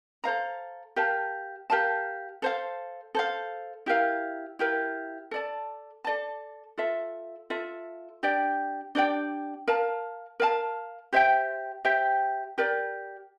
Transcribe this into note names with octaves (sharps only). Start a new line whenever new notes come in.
A4 C5 F5 A#5
G4 A#4 F5 A5
G4 A#4 F5 A5
A4 C5 F5
A4 C5 F5
E4 G4 A#4 F5
E4 G4 A#4 F5
A4 D5 A5
A4 D5 A5
F4 A4 E5
F4 A4 E5
D4 G4 D5 G5
D4 G4 D5 G5
A#4 F5 A5
A#4 F5 A5
G4 C5 E5 G5
G4 C5 E5 G5
G4 A#4 D5